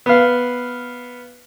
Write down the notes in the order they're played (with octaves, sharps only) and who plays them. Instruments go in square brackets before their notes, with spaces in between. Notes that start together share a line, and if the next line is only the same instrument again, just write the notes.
[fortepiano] B3 F5